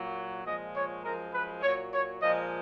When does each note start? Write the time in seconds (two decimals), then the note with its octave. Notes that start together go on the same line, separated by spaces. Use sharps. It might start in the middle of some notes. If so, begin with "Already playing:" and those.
Already playing: A#2 F#3
0.45 A#2 F3 G#3 D#5
0.75 C#5
1.04 F#2 F3 G#3 A#4
1.33 B4
1.63 A#2 F#3 C#5
1.92 C#5
2.21 A#2 F3 G#3 D#5